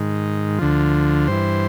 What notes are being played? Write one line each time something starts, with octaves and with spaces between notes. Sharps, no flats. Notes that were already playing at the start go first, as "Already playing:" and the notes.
Already playing: G#2 D#3
D2 D3 F3
G2 E3 C5